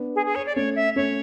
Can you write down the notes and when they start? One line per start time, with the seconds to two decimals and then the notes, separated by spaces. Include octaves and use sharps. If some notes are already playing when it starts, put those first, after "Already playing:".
Already playing: B3 D4
0.16 G#4
0.26 G#4
0.35 C#5
0.46 D5
0.55 A3 C#4 C#5
0.76 E5
0.96 A3 C#4 C#5